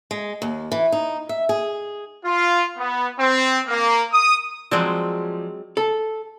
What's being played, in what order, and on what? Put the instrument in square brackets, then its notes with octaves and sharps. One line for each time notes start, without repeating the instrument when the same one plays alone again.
[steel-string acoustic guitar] G#3
D#2
E3
D#4
E5
G#4
[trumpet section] F4
B3
C4
A#3
D#6
[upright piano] F3 D5 [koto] F#3 G#3 C4
[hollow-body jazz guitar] A4